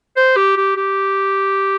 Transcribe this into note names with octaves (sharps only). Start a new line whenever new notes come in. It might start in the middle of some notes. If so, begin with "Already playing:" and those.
C5
G4
G4
G4